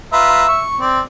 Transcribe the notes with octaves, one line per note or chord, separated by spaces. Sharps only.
F4 B4 E5 A#5
C#6
C4 D5